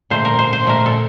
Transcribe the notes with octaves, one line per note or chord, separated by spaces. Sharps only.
A#2 F3 A3 C5
A#4
C5
C5
A#2 F3 A3 A#4
A4